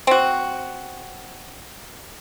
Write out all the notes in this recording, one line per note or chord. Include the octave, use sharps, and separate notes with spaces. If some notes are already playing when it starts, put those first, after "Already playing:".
C4 F#4